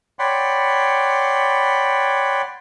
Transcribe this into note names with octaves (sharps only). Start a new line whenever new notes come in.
C#5 D5 F#5 G5 B5 C6